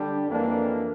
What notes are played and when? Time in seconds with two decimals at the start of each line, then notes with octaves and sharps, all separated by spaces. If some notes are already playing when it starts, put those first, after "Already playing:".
Already playing: D3 G3 D4 G4
0.28 F2 E3 A#3 D4